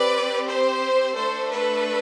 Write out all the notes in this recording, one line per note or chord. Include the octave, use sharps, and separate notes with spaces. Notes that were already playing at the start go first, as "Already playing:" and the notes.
Already playing: C4 G4 B4 D5
C5
A3 D4 A4 C5
B4